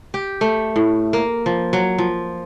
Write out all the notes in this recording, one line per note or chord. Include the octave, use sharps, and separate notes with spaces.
G4
A3
A2
A#3
F3
F#3
F3